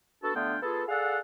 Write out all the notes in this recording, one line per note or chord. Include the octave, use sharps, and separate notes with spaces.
B3 D4 F#4 A4
D3 A3 B3 D4 F4 G5
B3 F4 G#4 A4
G#4 A4 D5 F5 F#5